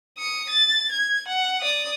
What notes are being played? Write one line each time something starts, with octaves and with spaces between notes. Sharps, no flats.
D#6 C#7
A6
G#6
F#5
D5 D#6